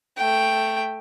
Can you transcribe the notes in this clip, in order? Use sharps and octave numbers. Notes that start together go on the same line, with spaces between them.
A3 G5